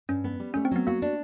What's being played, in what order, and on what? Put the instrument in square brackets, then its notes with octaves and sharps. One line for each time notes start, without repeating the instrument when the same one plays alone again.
[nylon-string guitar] G2 [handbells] C#4
[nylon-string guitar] B3
G3
[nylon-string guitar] A3 [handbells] C#4
[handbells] C4
[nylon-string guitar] F#3 [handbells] B3
[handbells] A#3 [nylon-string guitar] F#4
[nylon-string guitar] D4